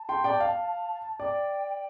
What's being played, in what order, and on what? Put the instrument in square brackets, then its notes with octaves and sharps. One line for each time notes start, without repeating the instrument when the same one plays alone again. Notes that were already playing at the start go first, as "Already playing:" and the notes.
Already playing: [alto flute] A5
[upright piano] G5 C6
D5 G5
F5
[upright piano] D5 [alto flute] G5